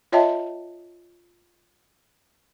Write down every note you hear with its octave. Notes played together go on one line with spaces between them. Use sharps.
F4 C#5 D#5 E5 G5 A5